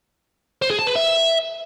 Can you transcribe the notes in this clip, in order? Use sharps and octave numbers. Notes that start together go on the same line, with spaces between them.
C5
G#4
A5
B4
E5